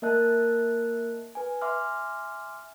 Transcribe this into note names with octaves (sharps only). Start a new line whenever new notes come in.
A#3 A#4 D#5 E5 A5 F#6
B4 G#5
E5 G#5 C6 D6 F6